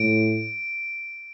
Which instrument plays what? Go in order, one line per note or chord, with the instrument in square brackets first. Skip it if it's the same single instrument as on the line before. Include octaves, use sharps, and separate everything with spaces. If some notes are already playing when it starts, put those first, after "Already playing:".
Already playing: [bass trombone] A2 [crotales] D7